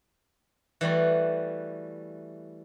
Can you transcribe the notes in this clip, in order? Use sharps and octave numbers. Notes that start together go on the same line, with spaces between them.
E3 G3 A3 F#4